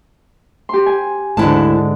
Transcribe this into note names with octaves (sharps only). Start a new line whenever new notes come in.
G4 C6
G#5
D2 G#2 D3 E4 A5